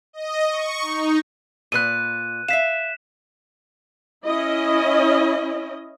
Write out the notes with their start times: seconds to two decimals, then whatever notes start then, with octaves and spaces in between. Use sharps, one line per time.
0.13 D#5
0.50 C#6
0.82 D#4
1.72 A#2 B4 F#6 D#7
2.48 E5 F5 B6 E7
4.26 C#4 E4 D#5